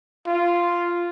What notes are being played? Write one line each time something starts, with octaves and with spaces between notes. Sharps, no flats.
F4